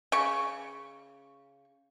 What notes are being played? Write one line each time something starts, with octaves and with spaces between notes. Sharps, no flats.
C#3 C#6